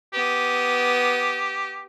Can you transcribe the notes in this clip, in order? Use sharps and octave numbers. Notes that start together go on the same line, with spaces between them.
B3 G4 D#6